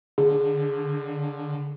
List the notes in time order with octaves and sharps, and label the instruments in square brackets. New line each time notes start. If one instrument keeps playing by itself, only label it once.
[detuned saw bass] D3 [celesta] G#4